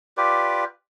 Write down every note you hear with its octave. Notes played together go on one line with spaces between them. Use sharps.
F4 G4 B4 D5